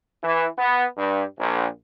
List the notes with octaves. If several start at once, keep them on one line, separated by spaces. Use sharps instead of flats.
E3
B3
G2
A#1